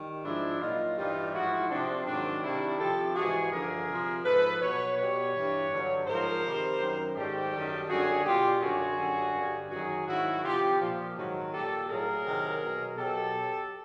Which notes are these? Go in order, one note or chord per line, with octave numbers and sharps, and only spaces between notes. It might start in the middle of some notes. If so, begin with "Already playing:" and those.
Already playing: D#3 G3
G#2 F3 D4 E4
A#2 F#3 D#4 F4
G2 E3 G3 D#4 F4
G#2 F3 E4 F#4
C3 F3 C4 D4
G#2 D#3 F#3 C4 D4
C3 D#3 G3 D4 E4
C3 F3 G4 A4
G#2 E3 G3 F#4 G#4
G2 D3 F3 G#4 A#4
C3 F3
G#2 F3 A4 B4
B2 F#3 B4 C#5
B2 G3 B4 C#5
G2 E3 G3
G2 D3 F#3
G#2 F3 A#4 C5
C3 D#3 G3
F#2 D#3 F#3
G#2 D#3 G3 G4 A4
F#2 D#3 G3
F#2 D3 G3 F#4 G#4
B2 G3 F4 G4
F#2 D3 F#3 F#4 G#4
F#2 D3 G3
G2 D3 G3
F#2 D#3 F#3 F#4 G#4
G#2 D#3 F#3 E4 F#4
C3 F3 F4 G4
A#2 F3
G#2 D#3 F#3
A#2 G3 G4 A4
A2 F#3 G#4 A#4
C3 D#3 F#3
B2 F#3
B2 F#3 G4 A4